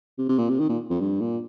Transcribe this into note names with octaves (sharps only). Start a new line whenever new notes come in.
C3
C3
A#2
C3
D#3
A#2
F2
G2
A#2